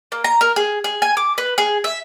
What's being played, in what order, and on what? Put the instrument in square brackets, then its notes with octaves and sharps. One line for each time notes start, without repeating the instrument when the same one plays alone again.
[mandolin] A#3
A#5
A#4
G#4
G#4
G#5
D6
B4
G#4
E5